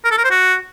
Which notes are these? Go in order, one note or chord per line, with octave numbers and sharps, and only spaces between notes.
A#4
A4
A#4
C5
F#4